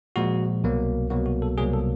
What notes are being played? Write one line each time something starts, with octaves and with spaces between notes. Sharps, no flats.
A#2 F3 G#3 F#4
C2 B2 F#3 A#3
C2 B2 F#3 A#3 F#4
F#4
A4
C2 B2 F#3 A#3 G#4
A4